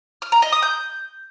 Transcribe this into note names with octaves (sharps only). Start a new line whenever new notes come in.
F6
A#5
D#5
D#6
G6